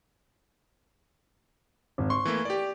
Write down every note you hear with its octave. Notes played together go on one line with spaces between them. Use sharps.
G#1
C6 C#6
E3 A3 A#3
G4 D5